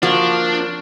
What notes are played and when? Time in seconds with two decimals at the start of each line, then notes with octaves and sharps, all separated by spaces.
0.03 F3 A#3 D4 F#4